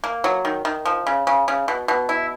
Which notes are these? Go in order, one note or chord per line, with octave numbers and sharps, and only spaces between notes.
A#3
F#3
D#3
D#3
F3
C#3
C#3
C#3
B2
B2
E4